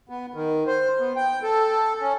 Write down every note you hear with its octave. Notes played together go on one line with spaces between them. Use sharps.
B3
D#3
C5
B3
G5
A4
C#4